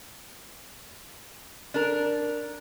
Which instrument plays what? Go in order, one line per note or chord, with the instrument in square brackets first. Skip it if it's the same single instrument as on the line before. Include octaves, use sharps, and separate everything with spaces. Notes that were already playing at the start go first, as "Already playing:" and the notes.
[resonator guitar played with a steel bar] D4 A#4